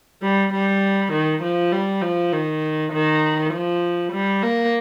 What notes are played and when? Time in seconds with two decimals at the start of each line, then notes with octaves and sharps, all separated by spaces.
0.23 G3
0.53 G3
1.12 D#3
1.42 F3
1.72 G3
2.02 F3
2.32 D#3
2.93 D#3
3.52 F3
4.12 G3
4.43 A#3